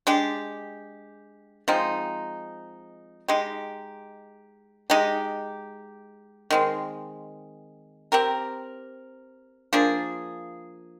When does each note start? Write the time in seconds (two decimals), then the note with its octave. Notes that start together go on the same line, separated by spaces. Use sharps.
0.07 G#3 D4 G4
1.68 F3 G#3 C4 D#4
3.28 G#3 D#4 G4
4.90 G#3 D#4 G4
6.51 D#3 G#3 C4
8.12 C4 G4 A#4
9.73 F3 A#3 D4 G#4